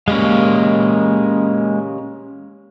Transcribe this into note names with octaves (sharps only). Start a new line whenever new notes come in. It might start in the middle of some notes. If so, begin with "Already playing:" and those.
G#3 A#3 C#4 G4 F5